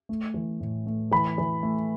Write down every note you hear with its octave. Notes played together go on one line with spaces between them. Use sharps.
A3
E3
A2
A3
E3 B5
E3
A3